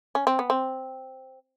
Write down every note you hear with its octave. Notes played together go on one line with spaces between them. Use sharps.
C#4
C4
B3
C4